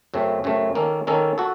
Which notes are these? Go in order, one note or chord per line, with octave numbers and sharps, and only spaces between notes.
F#2 C#3 A3 C4
F#2 C#3 A3 C4
D#3 A#3 C#4 A4
D#3 A#3 C#4 A4
F#4 A4